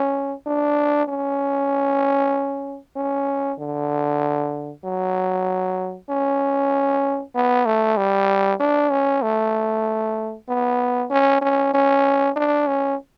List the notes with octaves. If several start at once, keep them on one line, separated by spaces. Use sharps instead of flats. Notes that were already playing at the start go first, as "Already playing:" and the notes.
Already playing: C#4
D4
C#4
C#4
D3
F#3
C#4
B3
A3
G3
D4
C#4
A3
B3
C#4
C#4
C#4
D4
C#4